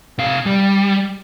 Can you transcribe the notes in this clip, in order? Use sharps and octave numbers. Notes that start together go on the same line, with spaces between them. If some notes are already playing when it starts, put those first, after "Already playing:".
C3 F5
G3